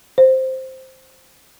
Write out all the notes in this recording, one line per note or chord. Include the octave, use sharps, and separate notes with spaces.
C5